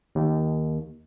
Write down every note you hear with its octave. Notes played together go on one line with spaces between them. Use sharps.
D#2